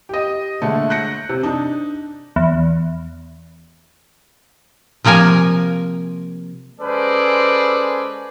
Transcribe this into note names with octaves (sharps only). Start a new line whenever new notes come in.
G4 D#5
A#2 D3 G#3 A3
F#6 G6 A#6 C#7
C3
D4 D#4
E2
C3 F3 A#3 A#4 G#5
G#3 C#4 A4 B4 C5 D5